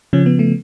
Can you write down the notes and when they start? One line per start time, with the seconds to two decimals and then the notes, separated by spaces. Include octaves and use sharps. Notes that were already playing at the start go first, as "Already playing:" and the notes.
0.13 C#3 F3 C#4
0.26 B3
0.39 A3